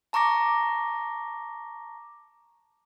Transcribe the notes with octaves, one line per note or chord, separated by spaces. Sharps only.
A5 A#5 C#6 D6 A#6